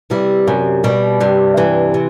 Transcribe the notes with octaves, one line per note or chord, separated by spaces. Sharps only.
C3 E3 G3
F#2 C3
B2 G3
G2 C3
C3 E3
C3